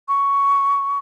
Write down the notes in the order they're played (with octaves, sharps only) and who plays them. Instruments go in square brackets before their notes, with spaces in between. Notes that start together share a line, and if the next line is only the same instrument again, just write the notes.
[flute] C#6